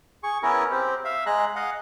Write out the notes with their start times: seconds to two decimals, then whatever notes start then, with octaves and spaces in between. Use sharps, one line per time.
0.23 G#4 C#6
0.43 B3 C#4 E4 G#4 A#4
0.71 C4 G4
1.05 E5 F5
1.26 G#3 G#4 A#5 F#6
1.56 D#5 F5 F#5